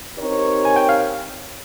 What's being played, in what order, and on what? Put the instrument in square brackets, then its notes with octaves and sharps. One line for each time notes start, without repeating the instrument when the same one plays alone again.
[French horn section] C4 D#4 G4 A#4 C#5
[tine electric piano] G#5
G5
F5